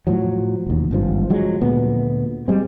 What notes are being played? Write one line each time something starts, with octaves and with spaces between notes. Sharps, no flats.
A2 F3 F#3
E1 D#2
G#1 G2 F3
F3 F#3 G#3
D2 A#2 B3
G3 G#3 C4